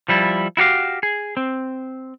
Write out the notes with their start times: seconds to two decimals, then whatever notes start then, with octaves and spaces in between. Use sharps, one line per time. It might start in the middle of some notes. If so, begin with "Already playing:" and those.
0.09 F3 G3 E4
0.57 E4 F#4 G4 F5
1.03 G#4
1.37 C4